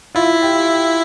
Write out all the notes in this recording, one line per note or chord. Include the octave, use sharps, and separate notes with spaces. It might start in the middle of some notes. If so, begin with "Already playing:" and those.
E4 F4
G4